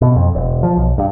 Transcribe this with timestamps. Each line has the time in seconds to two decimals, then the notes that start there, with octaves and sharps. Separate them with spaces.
0.01 B2
0.16 F2
0.35 E1
0.63 F3
0.76 B1
0.98 G2